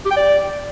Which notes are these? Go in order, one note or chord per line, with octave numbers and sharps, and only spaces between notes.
G4
G5
D5